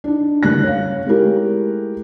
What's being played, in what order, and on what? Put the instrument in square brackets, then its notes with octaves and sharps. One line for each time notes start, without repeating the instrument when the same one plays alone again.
[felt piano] D4 D#4
F#1 G2 F#6 A#6
C#5 F5
G#3 A3 D#4 E4 G4 A#4